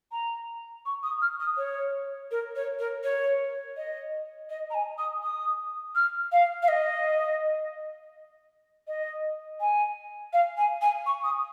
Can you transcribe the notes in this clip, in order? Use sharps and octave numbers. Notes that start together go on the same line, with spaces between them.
A#5
C#6
D#6
F6
D#6
C#5
A#4
C#5
A#4
C#5
D#5
D#5
A#5
G#5
D#6
D#6
F6
F5
F5
D#5
D#5
G#5
F5
G#5
G#5
C#6
D#6